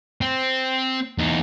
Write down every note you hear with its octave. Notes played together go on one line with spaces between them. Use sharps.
C4
E2 D#4